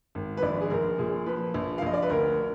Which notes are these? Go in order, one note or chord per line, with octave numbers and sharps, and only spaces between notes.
G#1
B4
A#1 D5
G#4
A#1 A#4
A#2 G#4
F3 B4
A#1
F5
A#1 D#5
D5
B4
D2 A#4